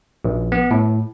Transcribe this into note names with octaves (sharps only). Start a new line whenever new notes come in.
A#1
B3
A2